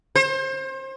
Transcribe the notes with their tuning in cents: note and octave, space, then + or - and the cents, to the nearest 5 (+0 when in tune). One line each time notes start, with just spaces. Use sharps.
C5 +30